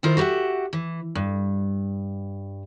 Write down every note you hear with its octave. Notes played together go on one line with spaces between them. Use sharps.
D#3 E4 F4 A#4 C5
F#4 G4 A#4 E5 F#5
E3
G2